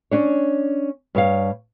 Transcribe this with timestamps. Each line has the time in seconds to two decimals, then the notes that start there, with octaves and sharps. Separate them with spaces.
0.11 C#4 D4 C#5
1.15 G2 C#5 F5